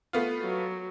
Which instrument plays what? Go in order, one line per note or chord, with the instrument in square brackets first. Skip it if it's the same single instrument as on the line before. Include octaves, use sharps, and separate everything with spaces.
[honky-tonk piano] A3 B3 F4
[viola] F#3